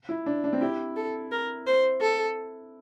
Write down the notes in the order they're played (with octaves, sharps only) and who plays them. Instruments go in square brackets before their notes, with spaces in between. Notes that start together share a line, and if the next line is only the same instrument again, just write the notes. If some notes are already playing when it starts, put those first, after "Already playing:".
[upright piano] E4
D4
D4
C4
[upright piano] E4 [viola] G4
[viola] A4
A#4
C5
A4